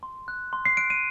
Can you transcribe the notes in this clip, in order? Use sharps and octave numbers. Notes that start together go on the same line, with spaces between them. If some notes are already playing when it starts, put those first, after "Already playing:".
C6
F#6
C6
C7
F#6 D7
D#7